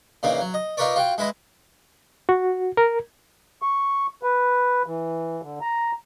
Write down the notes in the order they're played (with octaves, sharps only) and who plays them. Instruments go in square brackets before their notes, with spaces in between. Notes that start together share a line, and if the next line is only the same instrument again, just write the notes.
[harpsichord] A#2 C#3 E3 A#3 D#4
F#3
D#5
D#4 F4 A#4 B4 C#5 D5
F4 F#4 G5
G#3 E4 B4 D#5
[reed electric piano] F#4
A#4
[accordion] C#6
B4
E3
D3
A#5